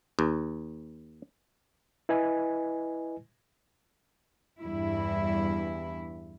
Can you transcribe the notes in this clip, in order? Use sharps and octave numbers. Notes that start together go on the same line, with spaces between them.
D#2
E4 B4 D#5 G#5
E2 G2 E4